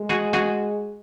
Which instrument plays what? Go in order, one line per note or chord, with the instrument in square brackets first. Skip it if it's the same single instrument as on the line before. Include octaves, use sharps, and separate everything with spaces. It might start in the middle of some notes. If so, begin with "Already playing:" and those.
Already playing: [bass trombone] G#3
[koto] F#4 G#4
F#4 G#4